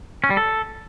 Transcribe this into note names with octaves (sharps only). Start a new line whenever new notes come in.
C#4
G3
A4